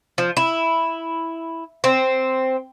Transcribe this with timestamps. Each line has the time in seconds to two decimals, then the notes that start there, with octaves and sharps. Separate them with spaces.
0.18 F3
0.37 E4
1.84 C4